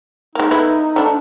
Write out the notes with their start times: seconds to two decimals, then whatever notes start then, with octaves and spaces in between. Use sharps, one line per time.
0.35 G#3 A#3 D#4
0.51 A3 B3 E4
0.96 A3 D4